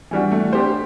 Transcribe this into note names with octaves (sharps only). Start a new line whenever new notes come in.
E3 G3 D4 F#4
A3
D4 G4 C5